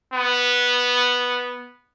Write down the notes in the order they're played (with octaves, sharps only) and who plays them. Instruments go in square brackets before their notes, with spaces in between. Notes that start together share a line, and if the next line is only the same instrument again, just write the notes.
[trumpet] B3